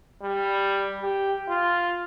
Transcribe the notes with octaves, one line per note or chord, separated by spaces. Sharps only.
G3
G4
F4